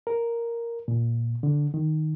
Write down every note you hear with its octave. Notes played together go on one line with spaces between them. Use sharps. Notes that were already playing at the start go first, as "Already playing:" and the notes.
A#4
A#2
D3
D#3